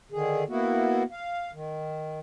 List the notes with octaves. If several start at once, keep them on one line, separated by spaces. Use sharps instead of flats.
D3 D#3 G#4
A#3 B3 E4 F#4
F5
D#3